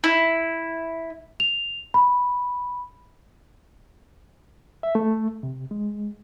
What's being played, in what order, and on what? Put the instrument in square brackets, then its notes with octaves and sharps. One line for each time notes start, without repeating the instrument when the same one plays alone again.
[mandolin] E4
[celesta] F7
B5
[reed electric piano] E5
A3
C3
G#3